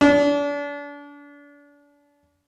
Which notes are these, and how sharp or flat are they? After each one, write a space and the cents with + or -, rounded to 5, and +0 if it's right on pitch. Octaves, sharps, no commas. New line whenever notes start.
D4 -35